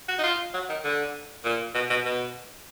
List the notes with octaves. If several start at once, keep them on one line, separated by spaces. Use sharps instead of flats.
F#4
D#4
F4
F#3
D#3
D3
A#2
B2
B2
B2